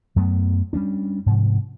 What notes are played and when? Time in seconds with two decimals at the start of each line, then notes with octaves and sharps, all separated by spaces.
0.16 F#2 F#3 A3 B3
0.73 G3 A3 C#4 D4
1.26 G#2 C3 F3